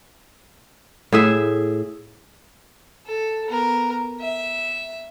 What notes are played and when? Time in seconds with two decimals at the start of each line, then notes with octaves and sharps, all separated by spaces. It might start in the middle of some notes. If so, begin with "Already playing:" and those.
1.12 A2 G#4 E5
3.07 A4
3.48 B3 A#4
4.20 E5